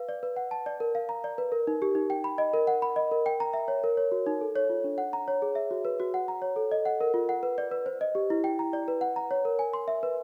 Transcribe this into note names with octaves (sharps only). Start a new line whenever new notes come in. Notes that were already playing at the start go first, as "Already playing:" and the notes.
Already playing: B4 F5
D5
B4
F#5
A5
D5
A#4
F5
A#5
D5
B4
A#4
D#4
G4
D#4
G5
B5
D#5
A#4
F#5
B5
D#5
A#4
G5
A#5
E5
C#5
A#4
C#5
F#4
D#4
A4
C#5
F4
D4
F#5
A#5
C#5
G#4
E5
F#4
B4
F#4
F#5
A#5
C#5
A4
D#5
F#5
A#4
F4
F#5
B4
D5
B4
C5
D#5
G4
E4
G5
A#5
D5
B4
F#5
A#5
C#5
A#4
G#5
C6
E5
B4